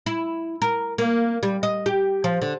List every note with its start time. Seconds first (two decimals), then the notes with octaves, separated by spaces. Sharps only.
0.06 E4
0.62 A#4
0.98 A#3
1.43 G3
1.63 D#5
1.86 G4
2.24 F3
2.42 D3